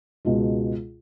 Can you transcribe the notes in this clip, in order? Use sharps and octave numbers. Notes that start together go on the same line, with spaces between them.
C#2 B2 G#3